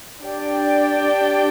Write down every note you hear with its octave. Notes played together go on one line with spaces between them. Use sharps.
D4 G4 D5 G5